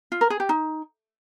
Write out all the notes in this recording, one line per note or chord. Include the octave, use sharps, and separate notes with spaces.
F4
A#4
G#4
G4
D#4